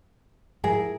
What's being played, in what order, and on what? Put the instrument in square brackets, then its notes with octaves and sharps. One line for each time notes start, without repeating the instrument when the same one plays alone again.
[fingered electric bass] G#2 F3 G3 [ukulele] E4 G#4 A#4